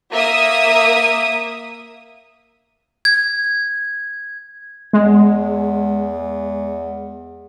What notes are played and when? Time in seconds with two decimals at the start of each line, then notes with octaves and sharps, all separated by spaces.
0.11 A#3 E5 D#6
3.05 G#6
4.93 E2 G#3